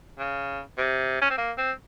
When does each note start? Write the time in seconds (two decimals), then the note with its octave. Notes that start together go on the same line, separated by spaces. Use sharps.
0.18 C#3
0.78 C3
1.21 C#4
1.30 C4
1.38 A#3
1.58 C4